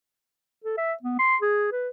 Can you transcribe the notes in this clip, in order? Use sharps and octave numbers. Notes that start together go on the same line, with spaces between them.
A4
E5
B3
C6
G#4
B4